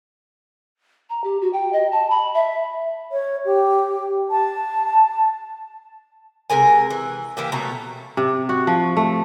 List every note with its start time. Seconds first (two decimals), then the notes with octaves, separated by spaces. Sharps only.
1.10 A#5
1.24 G4
1.41 F#4
1.53 G5
1.73 D#5
1.92 A5
2.10 B5
2.34 E5
3.11 C#5
3.45 G4
4.30 A5
6.50 C3 G#3 A#4 G#5
6.90 E3
7.37 E3 A#3 G4
7.52 B2 F#3 A3 A#5
8.17 C3
8.49 F#4
8.67 F3
8.97 A3